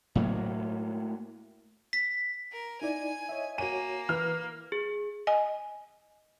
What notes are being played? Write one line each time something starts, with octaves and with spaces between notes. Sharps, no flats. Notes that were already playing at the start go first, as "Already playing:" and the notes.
A2 F#3 A#3
B6
A#4
D#4 E4 D5 G#5
C#5 D#5 E5
A#3 F#4 C#5 G#5 D#7
E3 E4 B4 F6
G#4
D#5 G#5